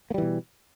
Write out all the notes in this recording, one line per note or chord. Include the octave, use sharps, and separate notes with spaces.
B2 E3 G3 A#3